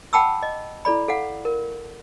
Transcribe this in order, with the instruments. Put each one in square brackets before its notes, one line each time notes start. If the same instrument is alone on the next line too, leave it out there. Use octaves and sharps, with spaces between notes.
[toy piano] F#5 G5 A5 B5 D6 E6
D#5
E4 A4 D5 B5
A4 F5 F#5
A#4